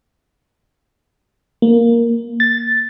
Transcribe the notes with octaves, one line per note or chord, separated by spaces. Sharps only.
A#3
A6